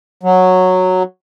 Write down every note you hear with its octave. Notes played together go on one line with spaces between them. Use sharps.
F#3